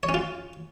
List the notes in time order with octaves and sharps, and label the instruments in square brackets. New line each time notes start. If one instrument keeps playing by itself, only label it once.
[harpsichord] C#5
C#4
F4